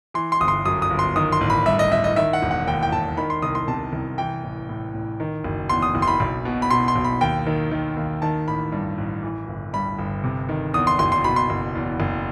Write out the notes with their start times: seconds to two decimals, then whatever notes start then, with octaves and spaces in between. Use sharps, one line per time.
0.14 E3 C6
0.32 C6
0.40 G1 D#6
0.48 C6
0.65 F#2 D#6
0.82 D#6
0.90 G1
0.99 C6
1.16 D#3 D#6
1.32 C6
1.41 A1
1.50 B5
1.66 G2 E5
1.79 D#5
1.91 A1 E5
2.04 D#5
2.16 D#3 E5
2.33 F#5
2.42 E1
2.51 F#5
2.67 D#2 G5
2.83 G5
2.92 E1 A5
3.17 D#3 B5
3.30 C6
3.42 C2 D#6
3.55 C6
3.68 C3 A5
3.93 C2
4.18 E3 G5
4.44 A1
4.69 A2
4.94 A1
5.20 D#3
5.44 F#1
5.69 E2 C6
5.82 D#6
5.95 F#1
6.02 C6
6.08 B5
6.20 B1
6.45 B2
6.62 B5
6.70 B2 C6
6.88 C6
6.96 B1
7.04 B5
7.21 D#2 G5
7.46 D#3
7.71 D#3
7.97 D#2
8.22 D#3 A5
8.47 A1 B5
8.72 G2
8.98 A1
9.23 E3
9.48 G1
9.73 G2 B5
9.99 G1
10.24 C3
10.49 D#3
10.74 E2 D#6
10.87 C6
10.99 F#1 C6
11.12 C6
11.24 B2 B5
11.36 C6
11.50 F#1
11.75 E2
12.00 F#1